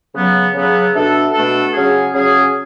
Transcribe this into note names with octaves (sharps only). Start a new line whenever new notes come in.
C#3 F#3 B3
C#3 F#3 B3
B2 A3 D4 A4
B2 A3 D4 A4
C#3 F#3 C#4 G#4
C#3 F#3 C#4 G#4